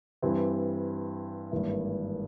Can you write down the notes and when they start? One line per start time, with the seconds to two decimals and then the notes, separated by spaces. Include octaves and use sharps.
0.22 G2 E3 G3 C4
1.51 G#1 G2 E3 A#3 E4